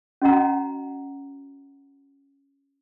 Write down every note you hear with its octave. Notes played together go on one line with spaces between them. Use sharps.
C#4 F#4 D#5 F#5 A#5